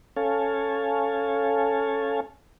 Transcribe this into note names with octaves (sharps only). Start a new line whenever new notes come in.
C#4 A4 C#5 F5 G#5 A5